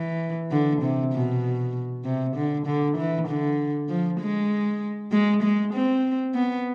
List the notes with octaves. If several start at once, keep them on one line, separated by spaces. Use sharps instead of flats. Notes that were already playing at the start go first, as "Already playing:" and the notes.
Already playing: E3
D3
C3
B2
C3
D3
D3
E3
D3
F3
G#3
G#3
G#3
C4
B3